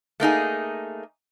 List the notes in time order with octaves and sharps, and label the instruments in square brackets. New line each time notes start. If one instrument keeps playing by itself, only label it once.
[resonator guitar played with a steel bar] A3 A#3 D#4 G#4